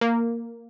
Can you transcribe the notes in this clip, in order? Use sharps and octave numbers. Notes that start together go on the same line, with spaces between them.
A#3